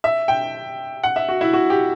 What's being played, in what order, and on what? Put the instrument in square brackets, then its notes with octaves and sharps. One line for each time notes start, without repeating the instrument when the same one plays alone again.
[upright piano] E5
G5
F#5
E5
F#4
E4
F#4
G4